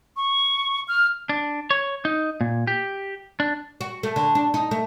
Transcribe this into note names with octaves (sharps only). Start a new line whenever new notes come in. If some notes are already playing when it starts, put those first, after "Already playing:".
C#6
F6
D4
C#5
D#4
A#2
G4
D4
F#4
A3
D3
D4
D#4
A3